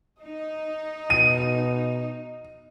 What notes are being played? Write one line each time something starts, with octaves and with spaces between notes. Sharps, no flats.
D#4 D#5
B2 D#7